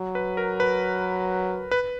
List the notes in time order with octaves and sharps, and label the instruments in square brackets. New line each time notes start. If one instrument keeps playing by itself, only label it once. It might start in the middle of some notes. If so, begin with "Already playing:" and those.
Already playing: [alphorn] F#3
[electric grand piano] B4
A#4
B4
B4